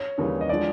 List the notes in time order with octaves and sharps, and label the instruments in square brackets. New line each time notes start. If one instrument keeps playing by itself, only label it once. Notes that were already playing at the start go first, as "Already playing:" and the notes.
Already playing: [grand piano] C#5
[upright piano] D#2 C#3 E3 G3
[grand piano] D#5
[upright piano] D3 F3 G#3 [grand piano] D5